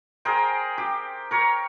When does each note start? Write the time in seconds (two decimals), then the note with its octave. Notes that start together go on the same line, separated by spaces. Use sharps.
0.25 G#4 A#4 C5 G5
0.78 G4
1.31 A#4 C#5